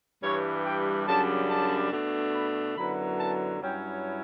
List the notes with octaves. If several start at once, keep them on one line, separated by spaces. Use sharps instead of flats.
G2 E3 G3 C#5
G5
F#2 C#3 G3 D4 A5
A5
B2 A3 D4
B5
F#2 D3 F#3 B3 E4 B5
A5
G2 F#3 C#4 E4 G5